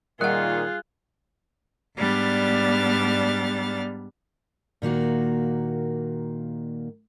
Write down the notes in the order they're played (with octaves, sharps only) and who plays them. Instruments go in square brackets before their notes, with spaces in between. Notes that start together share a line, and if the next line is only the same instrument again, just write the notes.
[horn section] A#2 D#3 [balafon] G3 F#5 [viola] F4 G#4 [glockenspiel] F#6
[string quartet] G#2 G3 B3 D4 F6 A6
[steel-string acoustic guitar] A#2 D#3 A#3 F#4